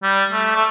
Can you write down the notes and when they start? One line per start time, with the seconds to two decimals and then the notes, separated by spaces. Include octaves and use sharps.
0.03 G3
0.32 A3
0.56 A3